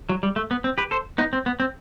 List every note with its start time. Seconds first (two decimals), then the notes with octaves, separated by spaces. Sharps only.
0.09 F#3
0.23 G3
0.36 A3
0.51 B3
0.64 C4
0.78 G4 B4
0.91 A4 C5
1.18 B3 D#4
1.33 C4
1.46 B3
1.60 C4